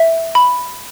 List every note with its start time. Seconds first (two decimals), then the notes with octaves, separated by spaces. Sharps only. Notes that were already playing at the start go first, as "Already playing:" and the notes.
Already playing: E5
0.35 B5